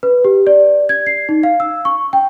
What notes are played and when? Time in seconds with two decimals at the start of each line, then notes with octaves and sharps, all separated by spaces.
0.03 B4
0.24 G4
0.47 D5
0.89 G#6
1.06 C7
1.29 D#4
1.43 F5
1.60 E6
1.85 C#6
2.13 G5